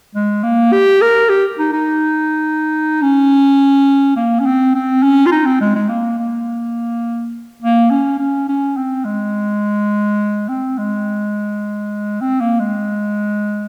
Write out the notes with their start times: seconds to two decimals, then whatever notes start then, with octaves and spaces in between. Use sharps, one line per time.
0.15 G#3
0.43 A#3
0.72 G4
1.02 A#4
1.29 G4
1.59 D#4
1.73 D#4
3.02 C#4
4.17 A#3
4.40 C#4
4.46 C4
4.75 C4
5.03 C#4
5.26 F4
5.32 D#4
5.46 C4
5.61 G#3
5.75 G#3
5.89 A#3
6.19 A#3
7.62 A#3
7.91 C#4
8.19 C#4
8.48 C#4
8.77 C4
9.05 G#3
10.49 C4
10.78 G#3
12.21 C4
12.41 A#3
12.59 G#3